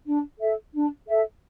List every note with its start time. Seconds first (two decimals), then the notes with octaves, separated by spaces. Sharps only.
0.05 D4
0.39 A4 E5
0.74 D4
1.08 A4 E5